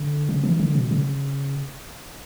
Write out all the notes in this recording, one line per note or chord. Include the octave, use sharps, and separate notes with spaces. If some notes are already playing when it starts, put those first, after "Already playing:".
Already playing: D3
C#3
E3
D3
B2
C#3